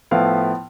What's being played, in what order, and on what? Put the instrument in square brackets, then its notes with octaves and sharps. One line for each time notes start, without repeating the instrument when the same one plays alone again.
[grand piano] A2 F3 B3 E4 F5